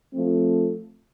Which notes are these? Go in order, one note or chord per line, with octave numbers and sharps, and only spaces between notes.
F3 A3 C4